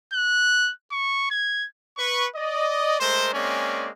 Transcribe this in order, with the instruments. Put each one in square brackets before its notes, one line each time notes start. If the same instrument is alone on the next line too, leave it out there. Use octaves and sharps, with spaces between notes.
[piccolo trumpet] F#6
C#6
G#6
[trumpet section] B4 C#6
D5 D#5
G#3 A3 A#4 C5
G#3 A#3 C4 C#4 D5